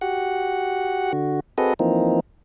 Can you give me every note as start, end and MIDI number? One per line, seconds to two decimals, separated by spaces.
0.01 1.12 66
0.01 1.12 67
0.01 1.12 78
1.13 1.40 50
1.13 1.40 66
1.58 1.74 60
1.58 1.74 66
1.58 1.74 68
1.58 1.74 69
1.58 1.74 71
1.58 1.74 75
1.79 2.20 52
1.79 2.20 53
1.79 2.20 58
1.79 2.20 60
1.79 2.20 63